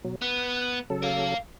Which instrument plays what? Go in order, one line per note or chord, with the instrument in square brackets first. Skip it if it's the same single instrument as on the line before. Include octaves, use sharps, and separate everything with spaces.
[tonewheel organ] B2 F#3
[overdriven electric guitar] B3 [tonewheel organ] F#6
[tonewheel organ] C#3 F#3 A4
[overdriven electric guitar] A#4 F5